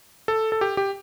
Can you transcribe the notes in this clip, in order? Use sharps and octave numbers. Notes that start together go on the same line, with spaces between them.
A4
A4
G4
G4